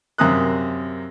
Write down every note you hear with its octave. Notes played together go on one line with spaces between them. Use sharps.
F#2 C3 A#3 D#6 F#6